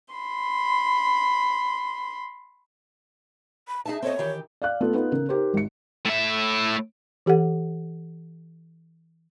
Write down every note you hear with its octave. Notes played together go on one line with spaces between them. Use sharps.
B5 C6
B5
D#4 G#4 E5 A5
C4 A4 C#5 D#5
D#3 E3 G4
D5 F5 F#6
A3 B3 F4 A4
B3 D#4 F4 B4
C#3 A#4
D#4 G4 A#4 C5
G#1 C#7
A2 E5
E3 G4 A4 F#5